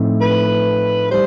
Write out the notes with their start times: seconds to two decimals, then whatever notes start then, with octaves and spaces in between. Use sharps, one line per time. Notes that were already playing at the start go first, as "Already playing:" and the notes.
Already playing: A2 F3 A3 C4 D#4
0.21 B4
1.11 G3 C5